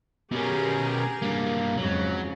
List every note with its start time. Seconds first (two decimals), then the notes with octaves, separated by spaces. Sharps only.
0.32 B2 C#4 G4 G#4 A#4
1.22 G2 A#3
1.77 F2 G#2 C#3 F#3